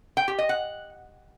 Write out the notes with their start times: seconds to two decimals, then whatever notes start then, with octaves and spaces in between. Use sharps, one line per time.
0.17 G5
0.28 G4
0.38 D#5
0.49 F#5